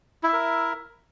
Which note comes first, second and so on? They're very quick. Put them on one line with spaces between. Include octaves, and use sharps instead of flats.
E4 E5 A#4